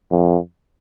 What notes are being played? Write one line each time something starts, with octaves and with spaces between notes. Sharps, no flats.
F2